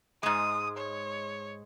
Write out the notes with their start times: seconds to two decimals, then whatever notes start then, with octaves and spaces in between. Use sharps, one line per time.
0.23 G#2 G#3 D#6
0.77 C#5